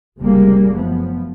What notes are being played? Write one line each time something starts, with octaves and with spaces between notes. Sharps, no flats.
F1 C#2 C3 G3 G#3 A#3
F#2 F3 B3